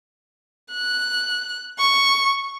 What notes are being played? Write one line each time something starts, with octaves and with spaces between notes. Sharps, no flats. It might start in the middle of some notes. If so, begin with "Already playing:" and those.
F#6
C#6